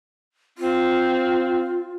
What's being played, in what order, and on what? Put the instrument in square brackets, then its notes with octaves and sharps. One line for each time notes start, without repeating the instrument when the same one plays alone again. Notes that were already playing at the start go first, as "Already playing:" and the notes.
[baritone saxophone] C4 [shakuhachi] F4